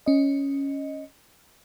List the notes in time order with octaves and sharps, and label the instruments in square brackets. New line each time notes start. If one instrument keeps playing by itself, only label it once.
[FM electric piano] C#4 D#5